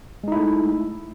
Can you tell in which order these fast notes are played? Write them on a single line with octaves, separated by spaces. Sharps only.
G#3 D#4 E4 A3